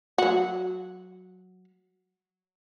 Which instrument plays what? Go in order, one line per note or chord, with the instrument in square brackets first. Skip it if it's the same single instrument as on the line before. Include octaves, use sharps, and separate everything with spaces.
[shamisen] F#3 F#4